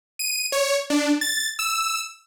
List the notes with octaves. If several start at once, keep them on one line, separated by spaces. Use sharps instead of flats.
D#7
C#5
D4
A6
E6